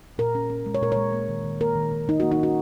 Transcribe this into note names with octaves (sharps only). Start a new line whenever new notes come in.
A#2 A#4
C#4
C#4
G#3
C#5
A#2 A#4
G#3 C#5
A#3
D#3
D#3
A#3 A#4
D#3
D#3
D#3 D#4
A#3 F#4
D#4
C#4 F#4